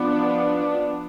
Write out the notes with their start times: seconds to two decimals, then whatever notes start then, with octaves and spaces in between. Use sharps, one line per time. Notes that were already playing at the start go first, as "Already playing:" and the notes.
Already playing: F3 B3 D4
0.27 F4
0.59 D4